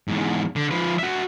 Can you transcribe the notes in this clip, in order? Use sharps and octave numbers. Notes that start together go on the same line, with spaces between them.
E2 G#2
D3
F3 B4
F#4 E5